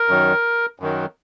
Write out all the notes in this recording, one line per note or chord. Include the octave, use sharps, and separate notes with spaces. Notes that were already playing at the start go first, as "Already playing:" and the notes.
Already playing: A#4
F#2 D#3 F#3
F#2 D#3 F#3